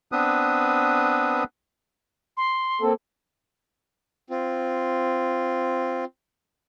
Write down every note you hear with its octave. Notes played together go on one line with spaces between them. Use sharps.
B3 C4 D4 B4 D#6
C6
A#3 C4 A4
C4 F4